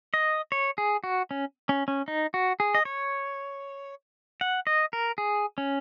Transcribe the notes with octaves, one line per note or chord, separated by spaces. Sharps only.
D#5
C#5
G#4
F#4
C#4
C#4
C#4
D#4
F#4
G#4
D#5
C#5
F#5
D#5
A#4
G#4
C#4